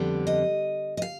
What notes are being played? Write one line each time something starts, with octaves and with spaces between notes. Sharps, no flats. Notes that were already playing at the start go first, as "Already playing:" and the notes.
Already playing: F2 D3 G3 B3
D#5
D#5
F5